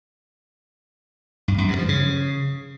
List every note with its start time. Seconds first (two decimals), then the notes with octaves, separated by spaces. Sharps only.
1.48 G2
1.58 F#2
1.68 G2
1.78 F3
1.89 C#3